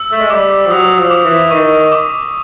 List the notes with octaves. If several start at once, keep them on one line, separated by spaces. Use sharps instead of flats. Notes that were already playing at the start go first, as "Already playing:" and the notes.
Already playing: E6
A3
G#3
G3 D6
F3
F#3 D#6
F3
D6
E3
D#3 C#6
D6